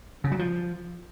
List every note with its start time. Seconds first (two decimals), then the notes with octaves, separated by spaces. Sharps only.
0.24 C#3
0.32 F#3
0.39 F3